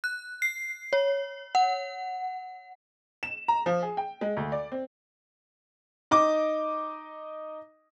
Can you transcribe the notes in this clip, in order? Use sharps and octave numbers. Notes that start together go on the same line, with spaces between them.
F#6
C7
C#5
F#5
E7
A#5
F3
G#4
G5
G#3
D2
D5
C4
D#4 D#5 D6